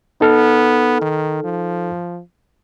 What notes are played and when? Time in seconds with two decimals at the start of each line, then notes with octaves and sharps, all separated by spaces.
0.21 B3 D#4 A4 F6
1.01 D#3
1.44 F3